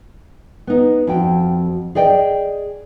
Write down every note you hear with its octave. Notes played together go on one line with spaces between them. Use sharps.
B3 D#4
F2 F#4 G5
G#4 D5 D#5 G5